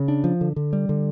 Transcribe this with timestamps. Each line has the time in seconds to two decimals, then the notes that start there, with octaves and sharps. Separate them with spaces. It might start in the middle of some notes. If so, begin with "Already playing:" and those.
Already playing: C#3
0.08 D4
0.24 F3
0.41 D3
0.56 D3
0.73 G3
0.89 D3